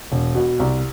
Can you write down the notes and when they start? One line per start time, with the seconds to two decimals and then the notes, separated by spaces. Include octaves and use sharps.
0.12 E1
0.35 B2
0.59 C2